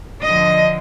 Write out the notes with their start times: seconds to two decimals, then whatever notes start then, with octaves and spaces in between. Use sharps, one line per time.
0.24 D3 F3 D#5